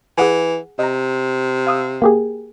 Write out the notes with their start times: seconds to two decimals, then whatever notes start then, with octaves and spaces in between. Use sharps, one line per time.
0.18 E3 G#4 F#5 G#5
0.79 C3 D#5 A#5
1.67 F5 D#6 E6
2.02 A#3 G4 G#4